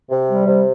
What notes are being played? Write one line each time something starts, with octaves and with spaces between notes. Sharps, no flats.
C3
G3
C3